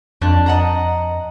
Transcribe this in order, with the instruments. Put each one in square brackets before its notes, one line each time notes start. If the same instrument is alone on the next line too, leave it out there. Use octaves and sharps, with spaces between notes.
[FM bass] F2 [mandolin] D4
[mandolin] D#5 F#5 A#5